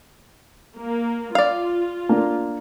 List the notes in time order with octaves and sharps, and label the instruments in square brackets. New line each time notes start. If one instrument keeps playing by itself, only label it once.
[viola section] A#3
[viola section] F4 [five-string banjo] D5 F5
[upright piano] A#3 D4 A#4